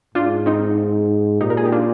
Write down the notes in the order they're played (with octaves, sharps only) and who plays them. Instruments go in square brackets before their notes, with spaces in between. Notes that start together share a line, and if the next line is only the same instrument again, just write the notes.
[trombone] G#2 [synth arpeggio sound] D4 F4
[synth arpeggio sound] C4 D#4
[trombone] A#2 [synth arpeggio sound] D#4 G4
[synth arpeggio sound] A#4
G#4
G4
D4 F4